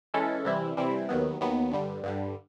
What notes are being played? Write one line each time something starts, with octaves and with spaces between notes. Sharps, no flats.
E3 G#3 C#4 E4 A4
C3 E3 G3 C4 E4
C3 E3 G3 C4 E4
D#2 D#3 F#3 B3
D#2 D#3 F#3 B3
G2 D3 G3
G2 D3 G3